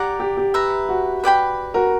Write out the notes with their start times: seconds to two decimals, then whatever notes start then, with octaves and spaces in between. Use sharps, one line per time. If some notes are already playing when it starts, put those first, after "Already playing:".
Already playing: G4 D5 F#5 A#5
0.20 G4
0.37 G4
0.54 B4 E5 A#5
0.89 F#4
1.24 B4 D5 G5 B5
1.74 F#4 A#4